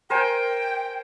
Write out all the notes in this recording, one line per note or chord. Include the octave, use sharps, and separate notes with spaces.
A#4 C5 G5 G#5